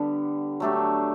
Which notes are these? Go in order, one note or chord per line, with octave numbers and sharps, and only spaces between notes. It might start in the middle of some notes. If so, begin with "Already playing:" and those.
Already playing: D3 G3 B3
F#3 A3 D4 G4